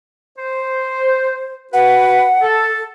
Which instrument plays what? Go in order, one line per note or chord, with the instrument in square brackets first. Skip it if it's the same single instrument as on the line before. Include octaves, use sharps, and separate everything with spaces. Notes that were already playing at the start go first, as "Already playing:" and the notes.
[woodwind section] C5
[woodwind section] F#4 B4 [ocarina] F#5
[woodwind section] A4